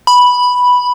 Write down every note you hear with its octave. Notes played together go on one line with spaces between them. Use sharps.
B5